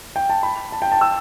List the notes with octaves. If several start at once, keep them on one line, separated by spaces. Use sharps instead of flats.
G5
A5
B5
A5
G5
A5
E6